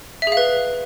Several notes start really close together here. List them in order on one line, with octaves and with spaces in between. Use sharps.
E5 G#4 F5 B4